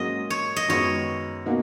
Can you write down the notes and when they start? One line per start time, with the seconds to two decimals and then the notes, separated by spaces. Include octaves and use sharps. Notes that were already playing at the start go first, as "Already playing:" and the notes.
Already playing: G#2 F#3 A#3 C#4 D#5
0.30 C#5
0.56 D#5
0.69 F#2 D#3 G#3 B3 C#5
1.46 B2 A#3 D#4 F#4